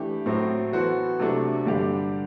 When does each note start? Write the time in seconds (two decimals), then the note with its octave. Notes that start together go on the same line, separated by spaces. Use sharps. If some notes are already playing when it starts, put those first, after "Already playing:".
Already playing: E3 A3 D4 G4
0.26 A2 F#3 A3 C4
0.73 E3 B3 F#4 A4 C5
1.19 C3 F#3 A3 D4 A4
1.66 G2 D3 G3 D4 G4